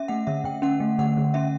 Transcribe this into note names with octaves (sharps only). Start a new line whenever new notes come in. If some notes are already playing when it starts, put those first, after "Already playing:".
Already playing: C#4 E5
A3 F#5
D3 E5
D3 G5
C#4 F#5
A3
D3 F#5
D3
C#4 E5